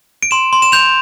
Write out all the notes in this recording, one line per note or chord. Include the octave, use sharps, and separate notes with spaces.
D7
C6 E7
C6
E7
G6 F7